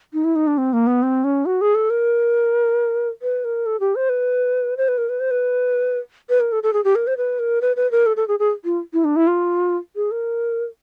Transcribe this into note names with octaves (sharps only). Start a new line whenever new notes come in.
D#4
E4
D#4
D4
C4
A#3
B3
C4
C#4
F#4
G#4
A4
A#4
B4
A#4
A4
G4
C5
B4
C5
B4
A#4
B4
C5
B4
B4
A#4
A4
A4
G#4
G4
A#4
C5
B4
A#4
B4
B4
A#4
A4
A4
G#4
G#4
F4
E4
D4
E4
F4
G#4
A#4